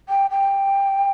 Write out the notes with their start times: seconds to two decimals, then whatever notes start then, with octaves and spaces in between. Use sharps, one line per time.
0.09 G5
0.31 G5